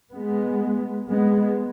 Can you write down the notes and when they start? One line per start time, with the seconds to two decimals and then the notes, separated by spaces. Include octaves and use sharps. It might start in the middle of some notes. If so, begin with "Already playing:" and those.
0.14 G#3 B3
1.09 G#3 B3